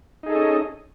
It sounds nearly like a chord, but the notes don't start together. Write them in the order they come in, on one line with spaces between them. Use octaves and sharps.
D#4 G#4 A4 D#5 C#4